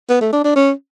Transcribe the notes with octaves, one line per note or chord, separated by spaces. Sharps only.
B3
A3
D4
D4
C#4